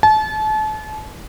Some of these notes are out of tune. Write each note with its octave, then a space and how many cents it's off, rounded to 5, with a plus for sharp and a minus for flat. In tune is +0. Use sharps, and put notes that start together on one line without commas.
A5 -35